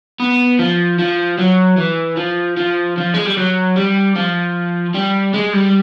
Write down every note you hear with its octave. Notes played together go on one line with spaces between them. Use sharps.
B3
F3
F3
F#3
E3
F3
F3
F3
G#3
G3
F#3
G3
F3
G3
G#3
G3